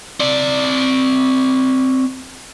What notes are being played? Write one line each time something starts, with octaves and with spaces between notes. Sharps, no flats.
C4 D5